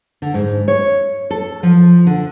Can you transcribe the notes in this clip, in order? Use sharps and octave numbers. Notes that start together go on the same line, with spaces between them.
D3
G#2
C#5
A4
F3
D3